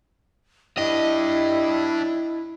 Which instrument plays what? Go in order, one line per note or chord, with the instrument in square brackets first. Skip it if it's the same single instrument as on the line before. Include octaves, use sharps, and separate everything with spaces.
[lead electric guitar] D4 G4 [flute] E4 [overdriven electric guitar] D#5